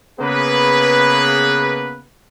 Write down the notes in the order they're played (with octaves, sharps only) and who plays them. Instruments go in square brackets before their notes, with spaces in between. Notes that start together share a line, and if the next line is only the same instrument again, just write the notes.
[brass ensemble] C#3 A#3 B3 G#4 B4